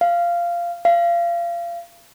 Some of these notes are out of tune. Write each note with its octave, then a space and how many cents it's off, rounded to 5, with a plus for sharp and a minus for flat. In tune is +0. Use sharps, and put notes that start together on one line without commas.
F5 -15
F5 -30